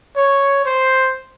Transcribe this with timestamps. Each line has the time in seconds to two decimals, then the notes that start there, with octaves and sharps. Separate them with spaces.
0.16 C#5
0.65 C5